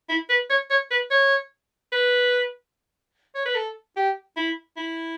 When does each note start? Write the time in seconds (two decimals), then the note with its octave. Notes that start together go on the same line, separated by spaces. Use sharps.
0.09 E4
0.29 B4
0.50 C#5
0.70 C#5
0.91 B4
1.10 C#5
1.92 B4
3.35 C#5
3.45 B4
3.55 A4
3.96 G4
4.36 E4
4.77 E4